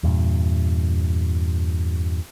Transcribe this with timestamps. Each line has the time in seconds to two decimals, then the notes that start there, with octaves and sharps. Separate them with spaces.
0.03 E2 G2 A#2